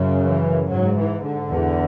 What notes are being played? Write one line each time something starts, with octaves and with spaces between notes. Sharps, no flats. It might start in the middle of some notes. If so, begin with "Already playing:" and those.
Already playing: F#2 C#3
E3
G#2 F#3
E3
D3
E2